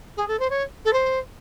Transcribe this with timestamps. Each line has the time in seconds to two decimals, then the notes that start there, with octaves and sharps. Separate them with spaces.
0.16 G#4
0.27 A4
0.39 C5
0.50 C#5
0.85 A4
0.93 C5